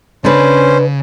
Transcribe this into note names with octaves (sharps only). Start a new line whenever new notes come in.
C#3 C#4 D4 B4 C5